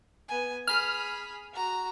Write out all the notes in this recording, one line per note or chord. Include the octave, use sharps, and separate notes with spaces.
B3 G#5
G#4 B5 F6
F#4 A#5